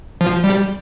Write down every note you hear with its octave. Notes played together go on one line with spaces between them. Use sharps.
F3
G3